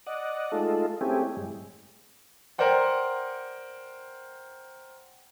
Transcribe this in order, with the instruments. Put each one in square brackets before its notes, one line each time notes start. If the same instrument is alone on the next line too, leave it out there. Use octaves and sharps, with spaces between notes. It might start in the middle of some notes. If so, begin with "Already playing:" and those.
[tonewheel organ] D5 D#5 F#5
G#3 A3 D#4 F4 A4
A3 C4 C#4 E4 G4 G#4
G2 G#3
[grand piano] A#4 C5 D5 F#5 G5